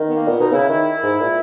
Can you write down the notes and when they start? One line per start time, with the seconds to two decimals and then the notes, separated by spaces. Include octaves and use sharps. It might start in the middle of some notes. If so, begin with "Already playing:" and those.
Already playing: D#3
0.09 B3
0.15 A#3
0.26 A#2 B3
0.39 B2 D#4
0.52 C#3 E4
0.69 D#3
1.03 G#2
1.20 A#2